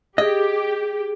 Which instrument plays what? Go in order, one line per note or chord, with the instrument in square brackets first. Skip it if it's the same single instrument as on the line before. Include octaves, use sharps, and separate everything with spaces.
[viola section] G4 [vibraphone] G#4 [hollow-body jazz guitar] D#5